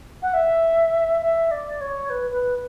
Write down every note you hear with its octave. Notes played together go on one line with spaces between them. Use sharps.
F#5
E5
E5
D5
C#5
B4
B4